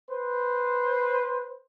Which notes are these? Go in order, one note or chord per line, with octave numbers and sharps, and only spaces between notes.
B4 C5